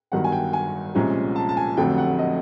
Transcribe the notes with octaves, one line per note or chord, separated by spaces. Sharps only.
G1 G2 D#3 F#3 F#5
G#5
G5
G#5
C2 A#2 F3 G#3 C#4
A5
A5
G#5
F1 F2 D3 F#3 A3 G5
F#5
D#5